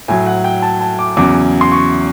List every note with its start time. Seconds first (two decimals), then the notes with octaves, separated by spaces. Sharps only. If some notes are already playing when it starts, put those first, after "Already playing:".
0.08 A2 F#3 G#5
0.26 F#5
0.44 G5
0.62 A5
0.81 A5
0.99 D6
1.17 E2 C#3 F#3 D6
1.61 C6
1.72 C#6